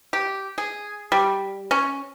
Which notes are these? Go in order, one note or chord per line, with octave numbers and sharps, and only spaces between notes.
G4
G#4
G3
C#4